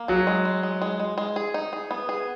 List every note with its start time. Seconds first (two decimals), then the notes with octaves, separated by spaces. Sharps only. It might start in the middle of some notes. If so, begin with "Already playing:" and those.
Already playing: A#3
0.08 F#3 G#4
0.27 G#3
0.45 G#3
0.63 G#3
0.82 G#3
1.00 G#3
1.18 G#3
1.36 G#4
1.54 D#4
1.73 G#4
1.91 B3
2.09 G#4